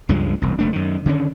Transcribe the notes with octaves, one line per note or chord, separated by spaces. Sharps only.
C#2 G2 F3 G#3
E1 C2
F#1 A3 D4
F#2 D#3
D3 D#3 C4 C#4